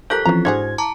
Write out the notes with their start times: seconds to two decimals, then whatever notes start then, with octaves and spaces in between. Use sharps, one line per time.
0.10 F3 G3 A4 A#4 F#6 G6 B6
0.25 E3 F3 C4 C#4 A#5
0.45 G#2 D4 E4 F#4 G#4 C5 G#6
0.78 A5 A#5 D6